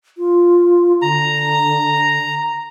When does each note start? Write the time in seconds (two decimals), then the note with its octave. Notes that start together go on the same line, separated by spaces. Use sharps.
0.18 F4
1.02 D3 A#5